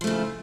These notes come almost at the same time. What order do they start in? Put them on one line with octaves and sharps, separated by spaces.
F3 A3 C#3